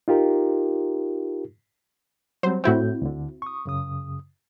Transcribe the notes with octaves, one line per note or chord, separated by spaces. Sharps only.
D#4 F4 G4 A#4
F#3 G3 C4 C5
A2 C4 E4 F#4 G6
D2 D3
C#6 D#6
F#2 C#3 D#6